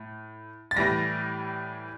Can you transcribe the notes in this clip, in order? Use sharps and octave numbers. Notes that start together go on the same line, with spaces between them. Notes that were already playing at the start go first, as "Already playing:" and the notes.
Already playing: A2
A6
A2 E3 G3 A#6